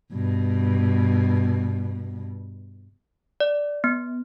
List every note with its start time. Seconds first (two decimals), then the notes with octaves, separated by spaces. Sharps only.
0.13 G2 B2
3.40 D5
3.84 B3